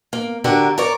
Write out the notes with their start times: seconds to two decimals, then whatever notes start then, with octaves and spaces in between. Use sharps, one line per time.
0.13 A#3
0.44 D3 F#4 G4 A#4
0.78 A#4 C#5 D5